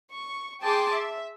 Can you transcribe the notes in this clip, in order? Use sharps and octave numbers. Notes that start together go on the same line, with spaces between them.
C#6
G#4 G5 A5 C6 D6
E5